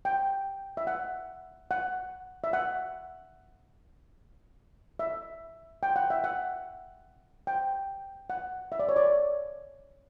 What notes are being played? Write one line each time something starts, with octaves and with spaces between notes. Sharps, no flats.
G5
E5
F#5
F#5
E5
F#5
E5
G5
F#5
E5
F#5
G5
F#5
E5
D5
C#5
D5